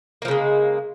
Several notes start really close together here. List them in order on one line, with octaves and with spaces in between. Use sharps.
A#3 F3 C#3 G#3